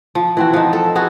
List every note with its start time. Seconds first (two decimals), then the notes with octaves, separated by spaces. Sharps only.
0.15 F3
0.37 E3 C4 F#4
0.53 F3 D#4
0.73 A4
0.95 B3 F#4 G#4 A4